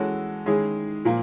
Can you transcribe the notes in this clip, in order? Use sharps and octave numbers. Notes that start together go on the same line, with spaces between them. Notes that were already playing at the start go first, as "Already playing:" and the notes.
Already playing: E3 G#3 C#4 F#4 A4
D#3 G#3 C#4 E4 G#4
A#2 F3 A#3